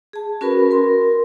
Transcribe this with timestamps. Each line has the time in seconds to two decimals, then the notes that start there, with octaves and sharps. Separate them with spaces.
0.13 G#4 A5
0.41 C#4 F#4 A#4 B4 B5
0.71 A#4 C6